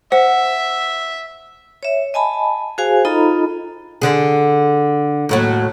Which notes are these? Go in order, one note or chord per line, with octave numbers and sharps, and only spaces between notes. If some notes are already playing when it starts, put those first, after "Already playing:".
C5 E5 F#5
C#5 E5
D#5 G#5 A5 B5
F#4 G#4 C5 F5 G#5
D#4 F4 A4 D#5 A#5 B5
D3 G#4
D#2 A2 F#3